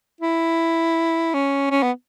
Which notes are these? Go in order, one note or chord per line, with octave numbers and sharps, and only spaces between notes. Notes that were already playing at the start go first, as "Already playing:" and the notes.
E4
C#4
C#4
B3